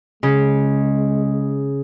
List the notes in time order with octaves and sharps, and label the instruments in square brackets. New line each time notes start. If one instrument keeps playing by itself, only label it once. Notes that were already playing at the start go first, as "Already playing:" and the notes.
[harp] C#3 [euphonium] G#3